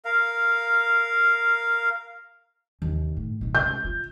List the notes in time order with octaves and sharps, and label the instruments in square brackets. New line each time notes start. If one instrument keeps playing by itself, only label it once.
[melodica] A#4 F5
[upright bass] D#2 C3
A2
B2 D#3
[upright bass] C#2 C3 [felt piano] G6
[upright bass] F4